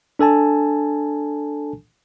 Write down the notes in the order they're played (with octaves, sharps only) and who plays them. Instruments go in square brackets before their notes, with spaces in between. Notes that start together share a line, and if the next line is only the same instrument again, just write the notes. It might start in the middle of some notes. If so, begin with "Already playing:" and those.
[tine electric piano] D4 A4 G#5 A5